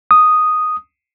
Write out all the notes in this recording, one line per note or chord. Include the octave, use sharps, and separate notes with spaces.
D#6